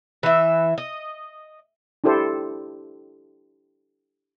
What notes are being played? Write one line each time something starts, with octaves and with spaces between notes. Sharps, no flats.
E3 E5
D#5
D4 E4 G4 A4 C5